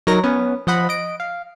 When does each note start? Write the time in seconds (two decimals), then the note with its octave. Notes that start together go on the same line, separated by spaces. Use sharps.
0.07 F#3 D#4 A#4 A#6
0.24 B3 C#4 B4
0.67 F3 D#5 F#5 B5
0.89 D#5 D7
1.20 F5